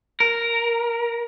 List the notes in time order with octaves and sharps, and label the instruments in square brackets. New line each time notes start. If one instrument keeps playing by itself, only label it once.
[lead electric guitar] A#4